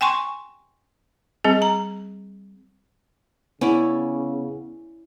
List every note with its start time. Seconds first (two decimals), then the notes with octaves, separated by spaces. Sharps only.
0.01 G5 G#5 C6 C#6
1.44 G3 C4 G#4
1.62 A#5
3.61 C#3 B3 C#4 E4 D5